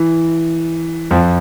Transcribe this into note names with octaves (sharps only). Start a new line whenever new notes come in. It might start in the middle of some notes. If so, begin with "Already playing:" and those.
Already playing: E3
F2 F3